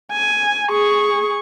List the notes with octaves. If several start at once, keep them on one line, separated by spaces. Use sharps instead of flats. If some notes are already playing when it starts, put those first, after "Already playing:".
G#5
G#4 C#6